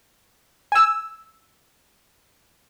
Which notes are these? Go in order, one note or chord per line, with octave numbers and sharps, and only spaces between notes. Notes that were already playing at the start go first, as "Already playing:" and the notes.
G#5 E6